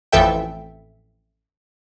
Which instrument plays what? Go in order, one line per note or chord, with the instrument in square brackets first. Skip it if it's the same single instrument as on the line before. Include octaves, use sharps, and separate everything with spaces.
[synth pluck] A1 F2 E3 A4 E5 G5